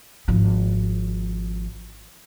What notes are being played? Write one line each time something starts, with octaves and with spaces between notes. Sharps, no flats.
G#1 F3